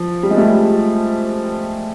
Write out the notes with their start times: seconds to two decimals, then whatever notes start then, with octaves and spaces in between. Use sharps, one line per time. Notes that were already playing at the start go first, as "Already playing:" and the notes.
Already playing: F3
0.23 G3
0.31 G#3
0.37 G3 A3